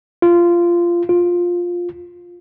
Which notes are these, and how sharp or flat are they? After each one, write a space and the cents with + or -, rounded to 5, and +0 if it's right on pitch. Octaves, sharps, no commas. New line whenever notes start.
F4 -15
F4 +10